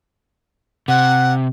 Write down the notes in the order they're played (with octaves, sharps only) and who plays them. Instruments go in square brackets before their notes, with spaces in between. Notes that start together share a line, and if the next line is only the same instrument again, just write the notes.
[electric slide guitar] C3 [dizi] F#5